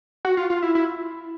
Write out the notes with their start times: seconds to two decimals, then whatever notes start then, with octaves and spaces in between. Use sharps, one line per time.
0.25 F#4
0.37 F4
0.50 F4
0.62 E4
0.75 E4